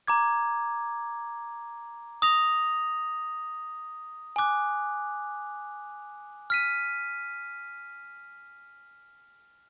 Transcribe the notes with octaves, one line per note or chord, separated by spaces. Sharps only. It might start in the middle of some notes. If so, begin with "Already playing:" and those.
A#5 D6 G#6
D#6 A#6 F7
G#5 D6 F#6
F6 B6 D#7